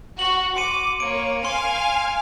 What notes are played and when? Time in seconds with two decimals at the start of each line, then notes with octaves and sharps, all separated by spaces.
0.19 F#4 F#7
0.56 C6 D6 C#7 D#7
1.00 A#3 C#5 D7
1.45 F5 G#5 C6 F6